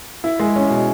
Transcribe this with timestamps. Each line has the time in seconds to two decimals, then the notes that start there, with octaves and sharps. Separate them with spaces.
0.24 E4
0.40 G#3
0.56 C#4
0.70 B2